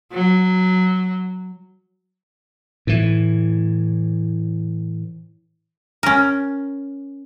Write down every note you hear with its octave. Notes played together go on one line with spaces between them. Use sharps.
F#3
A2 E3
C#4 A#4